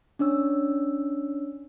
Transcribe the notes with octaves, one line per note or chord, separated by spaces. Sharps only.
C#4 D4 C#5 E6